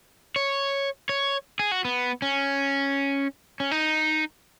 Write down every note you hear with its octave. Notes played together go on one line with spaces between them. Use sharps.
C#5
C#5
G#4
F#4
B3
C#4
C#4
D#4